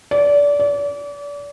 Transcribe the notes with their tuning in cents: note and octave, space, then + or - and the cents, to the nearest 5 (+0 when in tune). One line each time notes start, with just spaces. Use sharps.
D5 -25
D5 -35